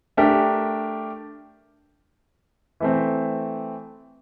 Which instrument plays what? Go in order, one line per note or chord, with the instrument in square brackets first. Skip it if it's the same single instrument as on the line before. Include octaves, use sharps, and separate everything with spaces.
[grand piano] A3 D4 G4 A#4
E3 A3 C4